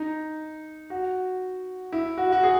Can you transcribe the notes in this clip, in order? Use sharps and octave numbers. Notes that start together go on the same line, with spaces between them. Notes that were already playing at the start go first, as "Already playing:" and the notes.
Already playing: D#4
F#4
E4
F#4
F#4
G#4